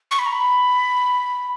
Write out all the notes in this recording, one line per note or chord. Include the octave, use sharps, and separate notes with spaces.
C#6
B5
A#5
B5